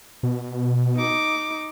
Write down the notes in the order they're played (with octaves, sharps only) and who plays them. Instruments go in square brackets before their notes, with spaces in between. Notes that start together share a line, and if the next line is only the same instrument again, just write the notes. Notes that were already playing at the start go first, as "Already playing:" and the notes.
[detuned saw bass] B2
[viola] D#4 D6